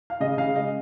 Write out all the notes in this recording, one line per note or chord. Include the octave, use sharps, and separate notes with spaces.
F5
C#3 D#5
C#3 F5
G#3 D#5